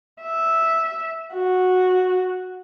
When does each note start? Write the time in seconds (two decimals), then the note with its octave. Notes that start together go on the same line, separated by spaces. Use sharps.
0.22 E5
1.34 F#4